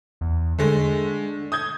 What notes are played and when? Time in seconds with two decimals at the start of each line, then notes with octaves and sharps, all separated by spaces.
0.21 E2
0.59 D3 G#3 A3
1.52 D#6 G6 G#6